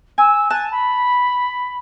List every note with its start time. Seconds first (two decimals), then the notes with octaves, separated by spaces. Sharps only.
0.18 G#5 E6
0.50 G#5 A5 F#6
0.71 B5